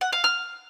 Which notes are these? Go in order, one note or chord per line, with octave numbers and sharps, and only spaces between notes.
F#5
F5
F6